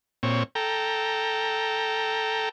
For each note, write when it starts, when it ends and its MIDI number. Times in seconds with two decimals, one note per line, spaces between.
0.23 0.43 46
0.23 0.43 60
0.23 0.43 73
0.55 2.49 69
0.55 2.49 79
0.55 2.49 82